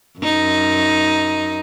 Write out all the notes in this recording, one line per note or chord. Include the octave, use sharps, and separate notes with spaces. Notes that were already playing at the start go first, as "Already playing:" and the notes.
F#2 D#4